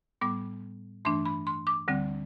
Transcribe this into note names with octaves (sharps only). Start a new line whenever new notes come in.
A2 G3 B3 D6
G2 E3 A3 D4 C6
B5
C6
D6
D2 D3 G3 C4